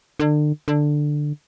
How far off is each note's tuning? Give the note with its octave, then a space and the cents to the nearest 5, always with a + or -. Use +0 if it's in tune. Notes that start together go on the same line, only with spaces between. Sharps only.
D3 +35
D3 +10